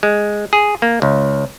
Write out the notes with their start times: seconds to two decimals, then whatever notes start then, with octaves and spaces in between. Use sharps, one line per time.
0.03 G#3
0.53 G#4
0.82 A#3
1.02 C#2